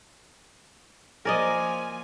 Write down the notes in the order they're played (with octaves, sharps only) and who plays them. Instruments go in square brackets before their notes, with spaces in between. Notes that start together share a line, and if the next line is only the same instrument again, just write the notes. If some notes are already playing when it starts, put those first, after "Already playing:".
[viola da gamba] F3 A#3 [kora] A#4 D5 D#5 [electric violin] G#5